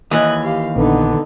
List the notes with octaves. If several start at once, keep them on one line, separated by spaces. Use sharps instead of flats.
D#2 E3 D#5 F#6 G#6
G4 F5
A#1 D3 B3 D#4